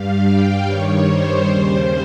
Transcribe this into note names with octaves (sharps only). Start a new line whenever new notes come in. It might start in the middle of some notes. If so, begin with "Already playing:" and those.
Already playing: G2 G3 F5
G5
G2 D#3 G3 C#5
C5
D#2 C#3 G3